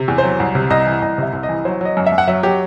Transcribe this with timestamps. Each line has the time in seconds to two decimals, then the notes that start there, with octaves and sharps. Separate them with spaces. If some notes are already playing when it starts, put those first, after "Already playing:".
Already playing: C3
0.08 E2
0.18 C5
0.24 F#3
0.40 C2
0.55 C3
0.70 C2 D#5
0.87 E3
1.02 C2 D#5
1.18 C3 E5
1.33 C2
1.43 D#5
1.49 E3
1.65 F#3 C5
1.81 F#3 D#5
1.97 F#2
2.06 E5
2.12 F#2
2.18 F#5
2.28 F#3 E5
2.43 F#3 G4